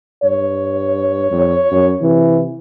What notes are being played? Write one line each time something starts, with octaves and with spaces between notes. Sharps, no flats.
G2 C#5
F2
F#2
C3 E3